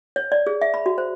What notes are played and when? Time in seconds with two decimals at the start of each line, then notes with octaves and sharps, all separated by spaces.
0.16 C#5
0.32 D5
0.47 G#4
0.61 E5
0.74 B5
0.86 F#4
0.98 C5